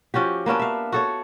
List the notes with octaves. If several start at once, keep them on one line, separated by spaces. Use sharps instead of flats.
F3 C#4 F#4 G4
A#3 B3 C#4 D4
E5 F5
F#4 A4 C#5